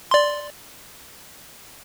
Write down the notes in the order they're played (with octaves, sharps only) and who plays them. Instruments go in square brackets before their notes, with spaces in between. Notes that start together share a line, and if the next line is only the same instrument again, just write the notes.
[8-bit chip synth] D5 C6